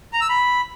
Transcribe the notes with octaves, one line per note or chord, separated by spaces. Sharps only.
A#5
E6
B5